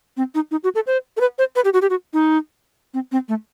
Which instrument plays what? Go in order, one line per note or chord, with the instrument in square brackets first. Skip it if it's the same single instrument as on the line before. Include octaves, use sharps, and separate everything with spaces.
[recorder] C4
D#4
D#4
F#4
A4
C5
A4
B4
C5
B4
G4
F#4
G4
F#4
D#4
C4
C4
A3